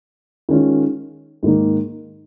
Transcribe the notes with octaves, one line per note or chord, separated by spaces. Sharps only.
D#3 G#3 C#4 F4
G#2 D#3 A#3 D#4